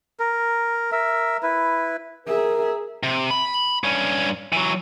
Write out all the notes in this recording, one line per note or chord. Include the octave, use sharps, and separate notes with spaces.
A#4
A#4 E5
E4 B4
G#4 A#4 E5
C3
B5
G2 C#4
E3 F#3